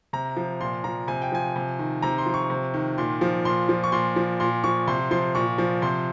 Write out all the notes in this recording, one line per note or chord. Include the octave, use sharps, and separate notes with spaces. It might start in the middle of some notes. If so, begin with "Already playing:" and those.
C3 A#5
F3
A#2 C6
F3 A#5
C3 G#5
G5
F3 G#5
C3
D#3
C3 A#5
C6
F3
C#6
C3
D#3
A#2 C6
F3
A#2 C6
F3
C#6
A#2 C6
F3
A#2 C6
F3 C#6
C3 C6
F3 C6
A#2 C#6
F3
C3 C6